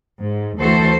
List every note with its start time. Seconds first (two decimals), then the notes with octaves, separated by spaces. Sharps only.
0.22 G#2
0.59 D2 E3 A3 F#4 A4 C5